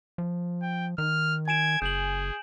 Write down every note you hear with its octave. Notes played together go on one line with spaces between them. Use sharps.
F3
G5
D#3 F6
G#5 G#6 D7 E7
F#1 G#4 G6 F#7